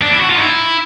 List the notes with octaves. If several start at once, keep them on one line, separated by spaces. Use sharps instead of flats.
D4
E4
F#4
F4
D#4
E4